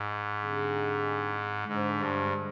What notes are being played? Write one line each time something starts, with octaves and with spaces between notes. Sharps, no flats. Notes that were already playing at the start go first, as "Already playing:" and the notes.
Already playing: G#2
D3 G3 C4 D#4 G#4
G#2 D3 G#3 D4 G#4 C5
G2